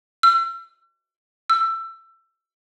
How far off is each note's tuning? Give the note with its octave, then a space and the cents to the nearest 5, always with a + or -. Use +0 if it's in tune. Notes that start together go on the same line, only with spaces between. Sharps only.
E6 +40
E6 +20